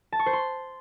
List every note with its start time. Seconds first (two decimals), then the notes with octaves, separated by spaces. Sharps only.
0.12 A5
0.19 C#6
0.26 C5
0.33 C6